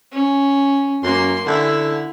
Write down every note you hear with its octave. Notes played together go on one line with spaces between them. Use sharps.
C#4
F#2 A#3 C6
D3 E4